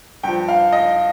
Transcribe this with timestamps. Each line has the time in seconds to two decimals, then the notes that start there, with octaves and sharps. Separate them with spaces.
0.23 G2 F3 G5
0.48 F5
0.73 D#5